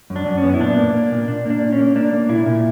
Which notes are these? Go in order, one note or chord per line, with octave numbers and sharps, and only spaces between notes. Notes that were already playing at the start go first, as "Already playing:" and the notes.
F#2
D4
F#2
C#4
B3
E4
A#2 D4
A#3
A#3
A#2
A#2 D4
A#3 D4
A#2
C#4
A#3
A#3 D4
A#3
A#2 E4
A#2